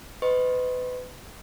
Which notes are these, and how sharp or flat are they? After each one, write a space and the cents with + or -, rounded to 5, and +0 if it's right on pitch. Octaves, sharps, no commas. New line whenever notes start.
B4 +30 D#5 +0 C6 +45